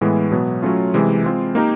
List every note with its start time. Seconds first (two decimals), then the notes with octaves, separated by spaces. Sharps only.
0.01 A2 E3 G#3 B3
0.32 B2 F#3 B3
0.63 F#3 A3 C#4 F4
0.94 C3 E3 G#3
1.24 G#3 C4 F4
1.55 A#3 D#4 G4 A#4